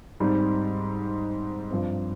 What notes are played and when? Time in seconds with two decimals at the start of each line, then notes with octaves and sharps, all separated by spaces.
0.20 G#2 G3 C4 D#4
1.70 G2 F3 C4